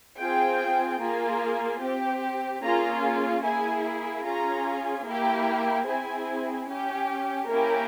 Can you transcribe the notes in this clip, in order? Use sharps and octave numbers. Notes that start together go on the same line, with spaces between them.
C4 F4 G#4 G5
A#3 F4 G#4
C4 G4
A#3 C#4 F4 G#4 A#5
A#3 E4 G#4 G#5
C#4 F4 G#4 A#5
A#3 E4 G4
C4 E4 G#4 G#5
C#4 G4
A#3 C#4 E4 G4 A#4